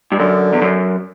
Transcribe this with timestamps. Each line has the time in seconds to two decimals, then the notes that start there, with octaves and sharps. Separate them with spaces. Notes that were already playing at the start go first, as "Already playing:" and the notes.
0.12 G2
0.19 F#2 D3
0.53 E2
0.62 F#2